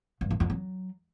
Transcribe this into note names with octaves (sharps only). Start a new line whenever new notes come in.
G2
F#2
F2
F#3